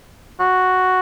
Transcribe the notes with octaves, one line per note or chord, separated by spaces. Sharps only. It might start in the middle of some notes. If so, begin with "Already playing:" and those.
F#4